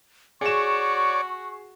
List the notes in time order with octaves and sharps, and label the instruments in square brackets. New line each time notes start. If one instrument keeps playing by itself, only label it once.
[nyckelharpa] F#4 [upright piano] G#4 E7 [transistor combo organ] C#5 D5 [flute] C#6